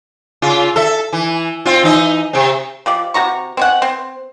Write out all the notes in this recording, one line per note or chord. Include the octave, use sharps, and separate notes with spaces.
C#3 F4
A4 E5
E3
C4 F4
E3 D#4 D#5
C3 C4
F3 G4 D5
C3 F#4 A#5 C#6
C4 C#4 F#5
C4